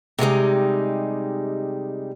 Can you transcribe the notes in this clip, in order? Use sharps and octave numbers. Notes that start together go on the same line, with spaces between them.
C3 G3 G#3 D#4